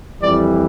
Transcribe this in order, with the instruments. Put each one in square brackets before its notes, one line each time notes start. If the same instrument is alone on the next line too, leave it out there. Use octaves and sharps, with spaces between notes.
[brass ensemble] F2 E3 G3 D5